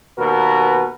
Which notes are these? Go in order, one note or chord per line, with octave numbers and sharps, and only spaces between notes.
D#2 B2 F#4 A#4 B4